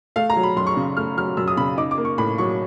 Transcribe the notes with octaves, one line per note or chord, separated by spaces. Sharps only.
A3 F5
A#5
F#3
B5
F#2 C6
C#6
C#3
A3 F6
F#3 F6
F#2 E6
D#6
C#3 B5
D#4 D6
D6
A#3
C#6
A2 B5
F#3 C#6